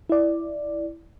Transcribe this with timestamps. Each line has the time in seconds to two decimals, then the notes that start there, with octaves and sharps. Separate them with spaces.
0.09 E4 D5